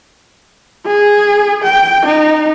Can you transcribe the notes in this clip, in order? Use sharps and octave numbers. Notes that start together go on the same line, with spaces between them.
G#4
G5
D#4